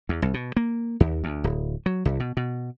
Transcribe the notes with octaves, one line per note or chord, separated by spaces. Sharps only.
E2
C2
B2
A#3
D#2
D2
D1
F#3
C2
B2
B2